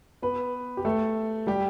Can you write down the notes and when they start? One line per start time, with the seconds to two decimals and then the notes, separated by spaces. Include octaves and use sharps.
0.22 B3 B4
0.77 G4
0.85 A3 A4
1.47 G3 G4